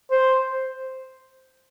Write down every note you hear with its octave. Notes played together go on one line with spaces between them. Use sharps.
C5